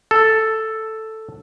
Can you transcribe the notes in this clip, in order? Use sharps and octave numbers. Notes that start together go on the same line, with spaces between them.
A4